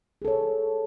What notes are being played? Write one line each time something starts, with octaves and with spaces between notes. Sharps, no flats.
G#4 A4 C#5